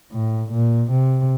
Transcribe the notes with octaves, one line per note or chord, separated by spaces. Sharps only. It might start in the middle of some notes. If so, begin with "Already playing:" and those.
A2
A#2
C3